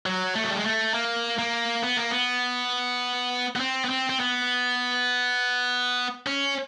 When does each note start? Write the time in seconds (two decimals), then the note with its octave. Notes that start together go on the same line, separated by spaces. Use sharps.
0.06 F#3
0.35 A3
0.44 F#3
0.50 G3
0.58 G#3
0.65 A3
0.94 A#3
1.39 A#3
1.84 B3
1.97 A#3
2.10 B3
3.56 B3
3.60 C4
3.84 B3
3.89 C4
4.10 C4
4.20 B3
6.27 C#4